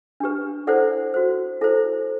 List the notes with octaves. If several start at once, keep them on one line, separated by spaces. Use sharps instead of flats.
D4 G4 B4
E4 A4 C5 D5 F#5
F#4 C5
E4 A4 C5